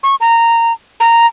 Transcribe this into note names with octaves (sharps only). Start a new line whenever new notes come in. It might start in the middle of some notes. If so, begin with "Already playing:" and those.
C#6
A#5
A#5